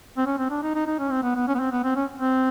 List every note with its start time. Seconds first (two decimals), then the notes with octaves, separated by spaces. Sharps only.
0.17 C4
0.26 C#4
0.38 C4
0.50 D4
0.63 D#4
0.75 D#4
0.87 D#4
0.99 C#4
1.11 C4
1.23 B3
1.35 B3
1.48 C#4
1.54 B3
1.60 C4
1.71 B3
1.84 C4
1.96 C#4
2.20 C4